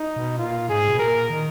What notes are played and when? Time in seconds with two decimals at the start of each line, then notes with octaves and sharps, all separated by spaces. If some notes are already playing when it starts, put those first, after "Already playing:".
Already playing: D#4
0.16 B2
0.38 A#2 F4
0.69 G#2 G#4
0.89 B2
0.99 A#2 A#4
1.30 D#3